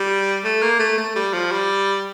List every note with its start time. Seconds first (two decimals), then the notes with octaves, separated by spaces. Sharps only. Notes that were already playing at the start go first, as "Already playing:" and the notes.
Already playing: G3
0.44 A3
0.62 A#3
0.79 A3
0.98 A3
1.15 G3
1.33 F3
1.52 G3